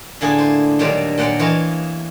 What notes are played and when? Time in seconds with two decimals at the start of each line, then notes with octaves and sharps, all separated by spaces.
0.21 A2 D3 A#3 E4 G#4 A4
0.38 C5
0.79 A#2 D#3 F#3 G3 D4 C5
1.18 A#2 F#3 F#5 G5 C6
1.39 E3 A#3 F4 C#5 D#5